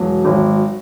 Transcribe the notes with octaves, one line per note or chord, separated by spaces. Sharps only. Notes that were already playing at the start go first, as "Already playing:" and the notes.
Already playing: E1 F#3
G#1